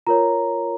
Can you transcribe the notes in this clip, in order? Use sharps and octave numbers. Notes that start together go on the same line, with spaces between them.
F4 A#4 C#5 A#5